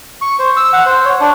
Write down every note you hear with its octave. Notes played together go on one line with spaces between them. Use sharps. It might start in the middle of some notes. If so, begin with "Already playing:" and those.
C#6
C5
E6
F#5
C5
C#5
D4